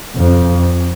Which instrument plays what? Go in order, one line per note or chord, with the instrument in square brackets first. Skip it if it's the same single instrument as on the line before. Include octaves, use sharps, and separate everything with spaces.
[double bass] F2